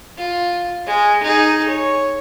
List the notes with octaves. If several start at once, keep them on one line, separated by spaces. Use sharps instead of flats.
F4
G#3
D#4 G#4
C#5